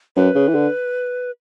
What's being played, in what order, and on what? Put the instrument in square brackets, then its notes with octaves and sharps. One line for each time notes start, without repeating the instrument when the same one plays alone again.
[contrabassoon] F#2 [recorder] B4
[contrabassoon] C#3
E3
D3